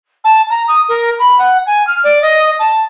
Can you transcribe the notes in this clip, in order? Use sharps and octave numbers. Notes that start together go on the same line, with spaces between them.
A5
A#5
D#6
A#4
B5
F#5
G#5
F6
D5
D#5
A5